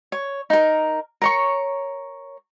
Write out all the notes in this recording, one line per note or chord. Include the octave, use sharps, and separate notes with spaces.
C#5
D#4 A#4
A#4 C#5 C#6